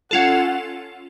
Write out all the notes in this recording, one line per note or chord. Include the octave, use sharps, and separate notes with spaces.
C#4 F4 A4 F#5